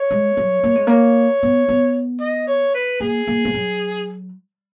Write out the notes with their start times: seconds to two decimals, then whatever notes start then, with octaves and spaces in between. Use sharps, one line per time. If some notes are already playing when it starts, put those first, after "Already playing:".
Already playing: C#5
0.11 G#3
0.37 F#3
0.63 A#3
0.75 G#3
0.87 A#3 C#5
1.43 B3
1.69 B3
2.21 D#5
2.48 C#5
2.75 B4
3.00 A#3 G#4
3.27 A#3
3.45 F3
3.54 F#3